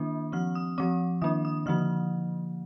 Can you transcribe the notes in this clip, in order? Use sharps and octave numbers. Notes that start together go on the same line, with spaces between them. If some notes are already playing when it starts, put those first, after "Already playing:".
Already playing: D#3 A#3 D4
F3 C4 F6
D#6
F3 C4 D6
D#3 A#3 D4 D#6
D#6
D3 F3 A#3 F6